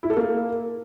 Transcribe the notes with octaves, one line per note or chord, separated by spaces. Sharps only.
E4
A4
A#3